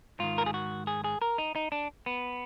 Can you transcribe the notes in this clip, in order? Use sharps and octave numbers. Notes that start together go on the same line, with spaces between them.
G#2 D#3 F4
A#4
G#4
F#4
G#4
G#4
A#4
D#4
D#4
D4
B3